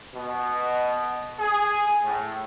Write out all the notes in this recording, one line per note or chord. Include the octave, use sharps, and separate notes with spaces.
B2
G#4
A2